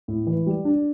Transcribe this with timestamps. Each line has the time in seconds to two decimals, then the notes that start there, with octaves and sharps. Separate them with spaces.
0.08 A2
0.27 E3
0.46 G3
0.65 D4